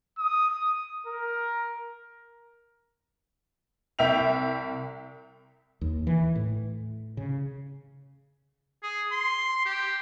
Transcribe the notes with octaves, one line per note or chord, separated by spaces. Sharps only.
D#6
A#4
C2 E5 G5 F7
D#2
E3
A2
C#3
G#4
C6
G4